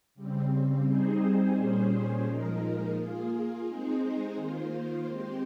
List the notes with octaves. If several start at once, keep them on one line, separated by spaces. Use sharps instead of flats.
C#3 G3 C4
G3 C4 D#4 G#4 C5
A#2 G3 C#4 G#4 C5
A#2 F3 G#3 D#4 A#4
A#3 F4 G#4
G#3 C4 D#4 G#4 C5
D#3 A#3 F4 C5
G#3 C4 G4 C5